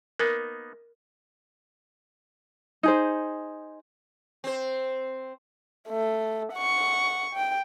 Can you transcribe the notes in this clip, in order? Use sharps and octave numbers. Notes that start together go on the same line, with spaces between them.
A#3 B3 D#4 A#4
D#4 G#4 C5
C4 C5
A3
F#5 C#6
G5